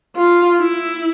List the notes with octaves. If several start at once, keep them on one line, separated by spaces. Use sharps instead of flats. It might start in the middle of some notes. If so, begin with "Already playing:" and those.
F4
E4